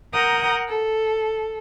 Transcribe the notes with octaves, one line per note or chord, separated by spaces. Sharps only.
A#4 F#5 A#5 D#6 G6
A4